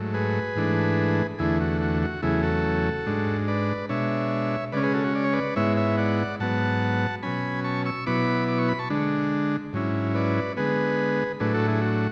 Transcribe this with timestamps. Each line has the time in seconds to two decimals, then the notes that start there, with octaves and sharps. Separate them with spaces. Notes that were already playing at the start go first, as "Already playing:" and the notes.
Already playing: G#2 F#3 A3
0.14 G#4 B4
0.56 G#2 E3 A3 D4
1.39 E2 D3 A3 E4 G#4
1.60 F#4
1.81 F#4
2.02 F#4
2.22 E2 C#3 F#3 A3 E4 G#4
2.43 F#4 A4
3.06 G#2 G#3 D4
3.48 B4 D5
3.89 B2 G#3 D4 C#5 E5
4.72 C#3 G#3 C#4 B4 D5
4.83 G#4 B4
4.94 F#4 A4
5.04 F#4
5.15 D5
5.24 C#5
5.33 B4 D5
5.56 G#2 G#3 B3 E4 C#5 E5
5.77 C#5 E5
5.97 D5 F#5
6.40 G#2 F#3 B3 F#5 A5
7.23 B2 F#3 C#4 G#5 B5
7.64 A5 C#6
7.86 C#6 E6
8.06 B2 F#3 B3 E4 B5 D6
8.48 D6
8.59 C#6
8.69 B5
8.79 A5 C#6
8.90 D3 G#3 D4
9.73 G#2 F#3 C#4 E4
10.15 B4 D5
10.57 D3 G#3 B3 G#4 B4
11.40 A2 F#3 A3 D4 G#4 B4
11.54 F#4 A4
11.68 E4 G#4
11.81 F#4